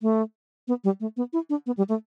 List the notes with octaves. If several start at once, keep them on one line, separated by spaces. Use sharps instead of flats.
A3
B3
G3
A3
B3
E4
D4
B3
G3
A3